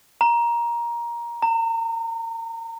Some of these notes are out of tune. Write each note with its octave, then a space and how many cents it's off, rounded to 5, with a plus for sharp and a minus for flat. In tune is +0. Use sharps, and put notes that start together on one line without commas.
A#5 +15
A#5 -35